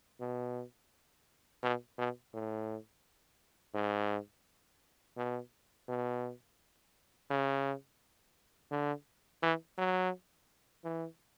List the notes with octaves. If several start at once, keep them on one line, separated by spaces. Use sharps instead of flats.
B2
B2
B2
A2
G#2
B2
B2
C#3
D3
E3
F#3
E3